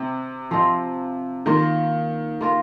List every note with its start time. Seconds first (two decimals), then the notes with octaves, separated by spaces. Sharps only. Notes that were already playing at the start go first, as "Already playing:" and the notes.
Already playing: C3 C4
0.51 F3 C4 F4 D#5
1.46 D#3 A#3 F4 A#4
2.41 A#3 F4 A#4